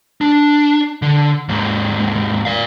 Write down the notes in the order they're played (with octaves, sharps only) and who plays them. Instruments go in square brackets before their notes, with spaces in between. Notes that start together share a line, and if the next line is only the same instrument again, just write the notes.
[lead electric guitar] D4
D3
D#2 G#2
D5 F5